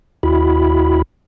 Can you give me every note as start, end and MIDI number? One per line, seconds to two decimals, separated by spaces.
0.23 1.02 39
0.23 1.02 64
0.23 1.02 66
0.23 1.02 83